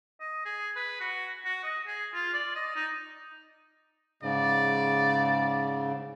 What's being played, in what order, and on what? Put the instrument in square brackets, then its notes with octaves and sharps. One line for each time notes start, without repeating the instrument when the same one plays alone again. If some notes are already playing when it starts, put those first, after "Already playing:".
[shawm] D#5
G#4
B4
F#4
F#4
D#5
G#4
F4
D5
D#5
D#4
[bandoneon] G#2 C#3 [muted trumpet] D5